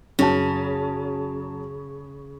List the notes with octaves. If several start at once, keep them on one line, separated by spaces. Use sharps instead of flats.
F#2 C#3 A5